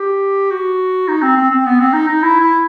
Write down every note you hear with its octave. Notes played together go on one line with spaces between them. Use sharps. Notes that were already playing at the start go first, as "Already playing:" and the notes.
Already playing: G4
F#4
D#4
C4
C4
C4
B3
C4
D#4
D#4
E4
E4